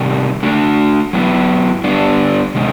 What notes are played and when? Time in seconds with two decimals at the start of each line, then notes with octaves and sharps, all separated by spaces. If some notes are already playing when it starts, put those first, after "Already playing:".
Already playing: C3 D#3 G3
0.43 A3 D4 F#4
1.13 F#3 B3 E4
1.84 G3 B3 D4
2.55 C3 D#3 G#3